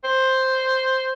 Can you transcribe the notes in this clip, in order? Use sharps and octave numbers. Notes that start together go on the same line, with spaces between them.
C5